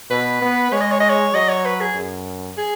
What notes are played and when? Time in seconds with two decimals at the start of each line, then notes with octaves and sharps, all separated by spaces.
0.11 B2 B4
0.42 B3
0.72 G#3 C#5
0.81 D#5
0.92 C#5
1.00 D#5
1.10 C#5
1.34 F#3 D#5
1.49 C#5
1.65 B4
1.80 G#4
1.95 F#2
2.58 G#4